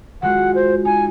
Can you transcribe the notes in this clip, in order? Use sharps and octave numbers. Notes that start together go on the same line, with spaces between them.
F#3 G#3 F4 F#5
C5
D#4 G#5